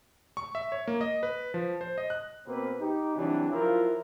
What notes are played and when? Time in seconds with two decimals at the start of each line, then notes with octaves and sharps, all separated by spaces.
0.37 C#6
0.55 E5
0.72 C#5
0.87 A#3
1.01 D#5
1.23 B4
1.54 F3
1.81 C5
1.98 D#5
2.10 F#6
2.47 B2 A#3 C4 B4
2.80 D#4 G4
3.16 C3 E3 F#3 G3 D4
3.51 F3 F#3 E4 F4 A#4